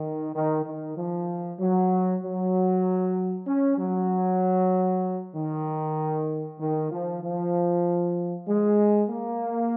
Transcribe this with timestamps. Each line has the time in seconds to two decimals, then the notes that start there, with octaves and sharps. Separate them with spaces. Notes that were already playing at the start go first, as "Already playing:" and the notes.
Already playing: D#3
0.34 D#3
0.65 D#3
0.97 F3
1.60 F#3
2.22 F#3
3.47 C#4
3.78 F#3
5.35 D#3
6.60 D#3
6.91 F3
7.23 F3
8.48 G#3
9.10 A#3